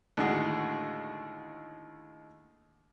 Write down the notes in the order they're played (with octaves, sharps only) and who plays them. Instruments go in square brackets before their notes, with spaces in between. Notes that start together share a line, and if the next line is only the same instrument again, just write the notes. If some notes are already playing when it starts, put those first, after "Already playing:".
[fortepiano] D#2 A2 D3 G#3 F#4 G#4